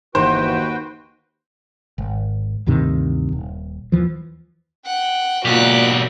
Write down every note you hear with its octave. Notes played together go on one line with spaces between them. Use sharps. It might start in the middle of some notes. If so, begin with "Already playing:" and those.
G1 D#2 E3 F#4 B4 C5 G5
G#1
D2 G2 C3 D#3
D#1
D#2 E3 F3
F#5 G5
B1 A#2 F#4 G4 F#6